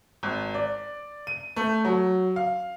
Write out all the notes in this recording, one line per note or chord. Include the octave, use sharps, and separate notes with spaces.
G#1
D5
D#7
A3
F#3
F5